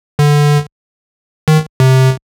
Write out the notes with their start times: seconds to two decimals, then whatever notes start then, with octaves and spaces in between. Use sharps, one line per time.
0.19 D3
1.48 D#3
1.80 C3